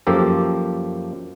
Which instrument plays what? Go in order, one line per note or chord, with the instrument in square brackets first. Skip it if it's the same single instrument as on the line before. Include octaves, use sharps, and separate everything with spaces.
[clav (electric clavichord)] F#2 F3 A#3 G4 A4